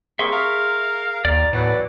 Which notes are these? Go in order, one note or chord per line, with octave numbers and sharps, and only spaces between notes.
G3 A#3 C4 G#4 E5 C6 C#6
A#4 F5
D#2 D5 A#5
A2 E3 F#3 B3 D5